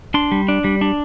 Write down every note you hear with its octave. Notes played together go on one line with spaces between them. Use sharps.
D4 C6
G3
D4
G3
D4